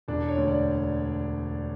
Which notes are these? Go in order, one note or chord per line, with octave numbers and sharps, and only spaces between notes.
E1 D4
C#5
D2
D5